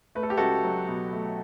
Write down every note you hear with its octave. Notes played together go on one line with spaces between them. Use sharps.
A3 B4
A4
G4
C#2 F#4 A4
F#3
B2
A3